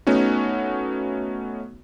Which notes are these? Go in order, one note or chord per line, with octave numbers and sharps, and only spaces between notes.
A3 B3 C#4 D#4 F#4